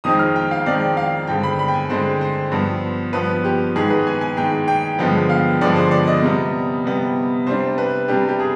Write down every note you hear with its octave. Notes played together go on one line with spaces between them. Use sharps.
F2 D#3 G#3 C4 D#4 D#6
F6
G5
F5
F2 D#3 G#3 C4 D#4 D5
F5
G2 D3 G#3 C4 G5
B5
B5
G5
G#5
G2 D3 G#3 C4 C5
C5
G2 F3 B3
G2 F3 B3 B4
G4
G#2 D#3 G#3 G#4
B4
G#5
G#5
G#2 D#3 G#3 G5
G5
G2 D3 F3 G#3 B3 G5
F5
G2 D3 F3 G#3 B3 D5
C5
D5
D#5
C3 G3 B3
C3 G3 B3
C3 G3 D4 C5
B4
C3 G3 D4 G4
G4
G#4